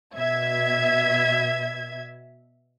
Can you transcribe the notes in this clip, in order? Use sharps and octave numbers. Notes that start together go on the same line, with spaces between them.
B2 E5 G#6